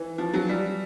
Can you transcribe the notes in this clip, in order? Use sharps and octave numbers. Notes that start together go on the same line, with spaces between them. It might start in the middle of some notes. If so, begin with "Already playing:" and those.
Already playing: E3
F3
F#3
G3